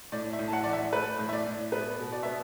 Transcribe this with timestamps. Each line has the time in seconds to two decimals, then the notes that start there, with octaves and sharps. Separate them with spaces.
0.12 A2 D5
0.33 E5
0.39 A2
0.48 A5
0.53 F#5
0.64 E3 D5
0.73 E5
0.92 A3 B4
1.19 A2
1.29 E5
1.33 D5
1.46 A2
1.72 B3 B4
1.99 B2
2.12 D5
2.23 B3 E5